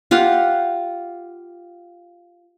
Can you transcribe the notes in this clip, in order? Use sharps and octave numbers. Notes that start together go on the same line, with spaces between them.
F4 G4 F5 F#5